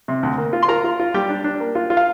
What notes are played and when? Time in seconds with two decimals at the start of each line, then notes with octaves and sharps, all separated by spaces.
0.08 C3
0.23 D2
0.38 A#3
0.53 F4
0.63 C6
0.68 F4 A#4 A#5
0.84 F4
1.00 F4
1.14 G3 G4 G5
1.29 D4
1.44 D4
1.60 A#3
1.75 F4
1.90 F4
1.97 F5